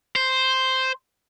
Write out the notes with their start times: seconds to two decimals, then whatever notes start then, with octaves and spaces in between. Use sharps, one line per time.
0.16 C5